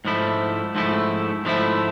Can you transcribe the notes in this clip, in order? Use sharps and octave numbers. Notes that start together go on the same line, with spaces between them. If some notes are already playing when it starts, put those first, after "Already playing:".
G#2 F3 A3 E4
G#2 F3 A3 E4
G#2 F3 A3 E4